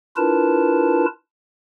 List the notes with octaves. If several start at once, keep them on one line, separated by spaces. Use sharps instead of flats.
D4 E4 F4 A#4 B4 A5